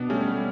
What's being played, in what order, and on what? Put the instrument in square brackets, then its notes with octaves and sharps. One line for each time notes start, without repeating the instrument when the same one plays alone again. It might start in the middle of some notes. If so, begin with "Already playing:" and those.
Already playing: [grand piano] B2 [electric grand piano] B3 D4
[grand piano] G3 [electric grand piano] A3 C#4
[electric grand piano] A3